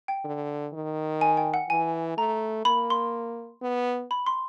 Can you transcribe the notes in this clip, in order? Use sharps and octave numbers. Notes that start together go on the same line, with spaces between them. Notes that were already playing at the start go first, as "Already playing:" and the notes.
G5
D3
D#3
G#5
G5
F#5
E3 G#5
A3 A#5
A#3 B5
C6
B3
B5
C6